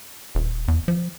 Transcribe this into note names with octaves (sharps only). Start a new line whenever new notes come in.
D#1
E2
F3